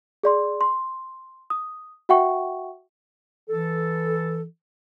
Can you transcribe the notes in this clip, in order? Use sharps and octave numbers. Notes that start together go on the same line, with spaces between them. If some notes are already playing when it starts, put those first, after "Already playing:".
G#4 D5 C6
C6
D#6
F#4 E5 F#5 G5 C#6
E3 A4